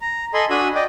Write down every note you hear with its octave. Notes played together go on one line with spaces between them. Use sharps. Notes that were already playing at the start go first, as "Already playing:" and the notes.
A#5
A4 D#5 G#5 B5 C6
D4 F#4 G#5 B5 D#6 E6
D5 D#5 G5